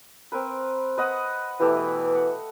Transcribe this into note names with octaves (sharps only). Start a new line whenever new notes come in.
C4 A#4 B4
B4 D#5 F#5
B2 E3 A3 G4 B4
F#5